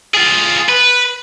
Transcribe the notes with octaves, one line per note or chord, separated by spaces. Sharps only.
F4 G#4
B4